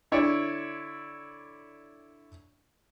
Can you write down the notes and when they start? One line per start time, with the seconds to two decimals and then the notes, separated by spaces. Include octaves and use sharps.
0.12 D3 E4 C#5 D5